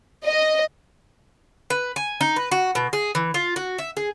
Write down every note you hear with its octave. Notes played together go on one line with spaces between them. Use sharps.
D#5
B4
G#5
D#4
B4
F#4
B2
G#4
E3
F4
F#4
E5
G#4